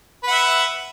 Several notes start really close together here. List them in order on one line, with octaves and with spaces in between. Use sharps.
B4 F#5 E5